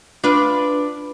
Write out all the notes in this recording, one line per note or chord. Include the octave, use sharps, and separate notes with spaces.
D4 F4 B4